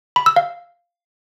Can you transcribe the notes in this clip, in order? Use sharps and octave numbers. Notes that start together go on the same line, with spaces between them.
B5
E6
F5